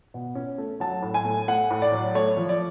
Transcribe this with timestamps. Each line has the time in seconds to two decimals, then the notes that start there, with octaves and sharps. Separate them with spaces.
0.14 B2
0.35 C#4
0.58 A3
0.80 F#3 A5
1.02 A2
1.14 G#5
1.25 A3
1.48 A3 F#5
1.71 A2
1.82 D5
1.92 F#3
2.15 A3 C#5
2.37 F3
2.49 D5